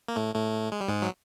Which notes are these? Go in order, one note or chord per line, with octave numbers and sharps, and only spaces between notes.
A#3
A2 A3
A2 A3
G#3
G3
G#2 G#3
F#3